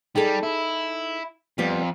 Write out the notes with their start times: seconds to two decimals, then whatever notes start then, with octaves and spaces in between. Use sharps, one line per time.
0.15 G3 D#4 G#4 A4
0.43 E4
1.58 F2 G3 B3 G4